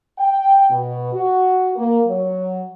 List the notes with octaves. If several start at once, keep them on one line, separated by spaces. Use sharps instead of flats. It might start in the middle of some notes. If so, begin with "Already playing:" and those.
G5
B2
F#4
A#3
F#3